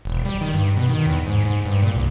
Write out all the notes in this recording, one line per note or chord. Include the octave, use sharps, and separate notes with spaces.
E1
G3
D#3
G2
B2
D#3
E2
G#2
G#2
G2
A#2
C2